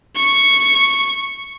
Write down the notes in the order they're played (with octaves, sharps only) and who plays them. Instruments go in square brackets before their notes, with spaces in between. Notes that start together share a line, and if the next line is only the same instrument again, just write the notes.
[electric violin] C#6